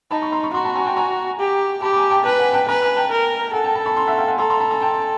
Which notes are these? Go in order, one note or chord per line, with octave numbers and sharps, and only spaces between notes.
D#4 A5 B5
B5 C#6
A#5 C6
B5 C#6
F#4 A#5 C6
A5 B5
G#5 A#5
G5 A5
G#5 A#5
G4
G4 A5 B5
B5
G#5 A#5
G5 A5
B4 G5 A5
F#5 G#5
G5 A5
B4 G#5 A#5
G#5 A#5
G5 A5
A#4
A4 F#5 G#5
G5 A5
A5 B5
B5 C#6
A#5 C6
E5 F#5
F5 G5
F#5 G#5
A4 A#5 C6
A#5 C6
A5 B5
G#5 A#5
G5 A5